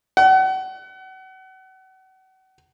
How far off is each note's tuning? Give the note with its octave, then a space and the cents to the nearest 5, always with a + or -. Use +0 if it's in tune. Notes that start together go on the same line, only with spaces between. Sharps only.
F#5 +35